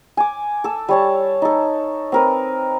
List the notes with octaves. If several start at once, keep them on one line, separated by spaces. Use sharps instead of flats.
G#5 D6
A4 E6
G3 C#5 A5
D#4 A4
C4 A#4 B4